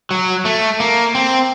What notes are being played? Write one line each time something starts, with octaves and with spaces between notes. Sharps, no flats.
F#3
A3
A#3
C4